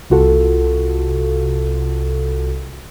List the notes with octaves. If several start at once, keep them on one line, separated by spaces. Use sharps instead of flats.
C2 C3 F4 F#4 A4